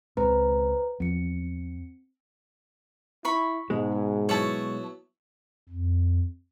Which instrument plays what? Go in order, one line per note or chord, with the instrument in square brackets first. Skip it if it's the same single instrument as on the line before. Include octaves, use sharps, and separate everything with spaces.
[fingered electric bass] C#2 G#3 C4 [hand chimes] B4 C5 A#5
[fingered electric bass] E2 F3 [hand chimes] C4 C#7
[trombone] E4 [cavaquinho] B5 C#6
[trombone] G#2 [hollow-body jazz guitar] B2 G#3
[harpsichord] F#3 B3 E4 [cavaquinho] C#5 A5
[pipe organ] F2